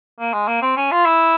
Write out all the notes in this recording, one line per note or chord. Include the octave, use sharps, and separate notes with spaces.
A#3
G#3
A#3
C4
C#4
F4
E4